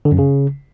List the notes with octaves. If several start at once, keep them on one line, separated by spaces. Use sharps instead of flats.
D3
F#2
C#3